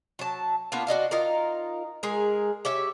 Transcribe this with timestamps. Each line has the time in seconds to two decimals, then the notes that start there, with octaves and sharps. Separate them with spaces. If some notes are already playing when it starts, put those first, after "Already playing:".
0.19 F#3 A5
0.72 A#3 B3 D4 F4
0.87 F#4 D5 D#5 F5
1.11 D#4 F4 A#4
2.03 G#3 G#4 A#4
2.65 G4 C#5 E5